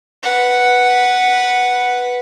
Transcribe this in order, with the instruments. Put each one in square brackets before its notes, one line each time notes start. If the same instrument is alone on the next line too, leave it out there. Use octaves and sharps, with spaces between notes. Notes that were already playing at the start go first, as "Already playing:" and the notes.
[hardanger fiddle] B4 F#5